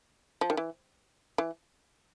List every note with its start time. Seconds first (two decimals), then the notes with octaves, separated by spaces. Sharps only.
0.41 F3
0.50 D#3
0.57 E3
1.38 E3